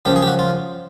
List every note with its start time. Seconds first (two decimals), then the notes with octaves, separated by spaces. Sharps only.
0.05 F#2 C#3 F3 G4
0.16 G#4
0.22 G4
0.27 F#4
0.39 F4